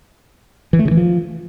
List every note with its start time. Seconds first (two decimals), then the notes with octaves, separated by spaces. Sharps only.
0.73 E3
0.79 A3
0.85 C#3
0.91 E3
0.97 F3